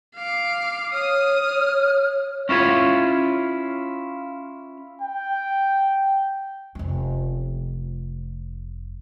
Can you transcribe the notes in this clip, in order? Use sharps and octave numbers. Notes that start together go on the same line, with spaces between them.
F5 D6
C#5 D#6 F6
C#4 E4 F4 C#5
G5
F1 C#4